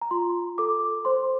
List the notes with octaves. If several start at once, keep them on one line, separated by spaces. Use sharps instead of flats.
A#5
F4 C6
A4 D6
C5 C6